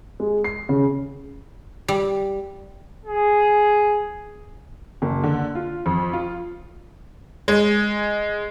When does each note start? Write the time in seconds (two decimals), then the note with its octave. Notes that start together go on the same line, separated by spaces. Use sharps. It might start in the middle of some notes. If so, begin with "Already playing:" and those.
0.20 G#3
0.44 C7
0.69 C#3
1.88 G3
3.05 G#4
5.02 F#1
5.24 D3
5.55 F4
5.86 F2
6.13 F4
7.48 G#3